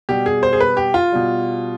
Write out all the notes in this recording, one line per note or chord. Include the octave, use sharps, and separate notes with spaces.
B2 G3 G4
G#4
C5
G#4
B4
G4
F4
B2 G3